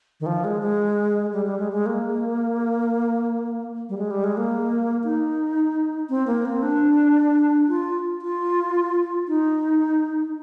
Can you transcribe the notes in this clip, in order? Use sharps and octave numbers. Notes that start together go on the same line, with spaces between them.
D#3
F3
G#3
G#3
G3
G3
G#3
G#3
A#3
G3
G#3
G3
G#3
A#3
D#4
C4
A#3
C4
D4
F4
F4
D#4